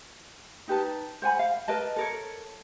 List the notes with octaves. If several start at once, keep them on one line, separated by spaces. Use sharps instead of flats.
D#4 G4 B4 A5
C5 F#5 G#5 B5
F5
A#4 B4 D#5 A5
A4 A#4 C#5